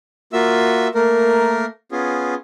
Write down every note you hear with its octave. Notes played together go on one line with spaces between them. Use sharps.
A#3 F4 F#4 E5 E6
A3 A#3 A#4
B3 C#4 F4 G#4